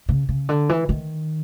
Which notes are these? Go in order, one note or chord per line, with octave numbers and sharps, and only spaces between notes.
C#3
C#3
D3
E3
D#3